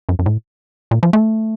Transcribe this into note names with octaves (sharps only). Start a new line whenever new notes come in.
F#2
F#2
A2
A#2
F3
A3